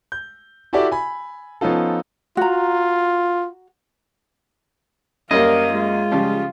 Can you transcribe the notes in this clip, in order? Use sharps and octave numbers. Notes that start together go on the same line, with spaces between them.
G6
E4 F#4 G4 A4 D5 E5
G#5 B5
F3 B3 C#4 D#4 F4 A4
F4 F#4 A#5
F#2 G3 A#3 A#4 D#5 F5
G#3 F4
C#3 F3 G3